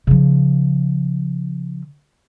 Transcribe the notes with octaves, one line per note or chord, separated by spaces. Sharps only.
C#3 F3